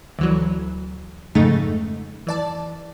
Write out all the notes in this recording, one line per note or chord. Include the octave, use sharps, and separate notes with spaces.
D2 E3 F#3
F2 G#2 C#3 G#3 A3 D#4
E3 D5 A5